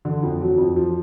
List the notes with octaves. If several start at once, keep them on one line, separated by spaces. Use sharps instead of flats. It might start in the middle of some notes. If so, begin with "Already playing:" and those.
D3
F2
F#3
F2
F3